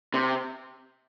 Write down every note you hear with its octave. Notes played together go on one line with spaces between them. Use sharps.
C3